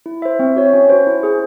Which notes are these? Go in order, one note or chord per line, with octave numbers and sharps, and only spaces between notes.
E4
C5 E5
C4
F#4 C#5
C#4
F#4 C5
E4
G#4 C5